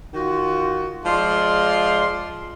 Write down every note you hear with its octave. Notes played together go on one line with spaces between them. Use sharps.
D#3 F4 F#4
F3 G#3 F4 D5 C6